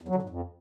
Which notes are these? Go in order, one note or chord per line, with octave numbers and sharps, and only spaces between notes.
E2
F#3
D3
G#2
F2